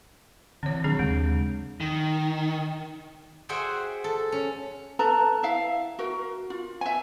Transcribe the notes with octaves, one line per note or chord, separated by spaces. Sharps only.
D3 E3 C4 C#5
B2 D#3 F#3 C4 D4 G#4
D#2 C#3 G#3
D#3
F#4 G#4 C5 E5 F#5 G5
A4
C#4
A4 B4 A5 A#5
E4 E5 F5
F#4 A#4
F4
E5 G#5